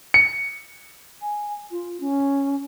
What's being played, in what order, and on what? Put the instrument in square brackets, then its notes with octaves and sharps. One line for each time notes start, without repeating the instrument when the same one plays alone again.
[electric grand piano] C#7
[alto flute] G#5
F4
C#4